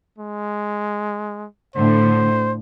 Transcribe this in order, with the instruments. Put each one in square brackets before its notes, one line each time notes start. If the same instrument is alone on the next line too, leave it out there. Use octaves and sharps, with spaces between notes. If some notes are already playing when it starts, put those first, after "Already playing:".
[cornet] G#3
[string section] A2 D3 [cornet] C5